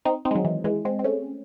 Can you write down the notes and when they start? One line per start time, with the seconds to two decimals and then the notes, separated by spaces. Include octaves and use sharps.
0.05 C4 D#4
0.25 C4 D#4
0.31 G#3
0.35 D#3 F#3
0.44 E3
0.64 E3 G#3
0.85 G#3 C4
0.99 C4
1.04 A3 C#4